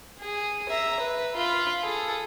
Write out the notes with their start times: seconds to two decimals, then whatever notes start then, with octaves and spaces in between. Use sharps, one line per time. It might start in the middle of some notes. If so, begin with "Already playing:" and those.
0.20 G#4
0.69 E5 A#5
1.00 B4
1.36 F4 B5
1.82 G#4 A4